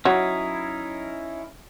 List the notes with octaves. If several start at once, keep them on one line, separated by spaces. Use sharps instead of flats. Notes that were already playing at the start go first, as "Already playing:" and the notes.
F#3 C#4 D#4 E4